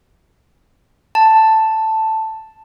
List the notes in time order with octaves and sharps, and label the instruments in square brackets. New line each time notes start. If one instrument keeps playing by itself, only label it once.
[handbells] A5